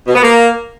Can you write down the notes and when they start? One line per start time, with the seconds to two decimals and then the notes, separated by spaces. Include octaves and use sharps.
0.07 B2
0.15 B3
0.23 A#3